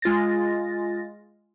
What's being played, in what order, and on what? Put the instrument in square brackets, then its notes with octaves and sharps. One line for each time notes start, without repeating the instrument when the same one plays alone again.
[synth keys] G#3 F4 A6 A#6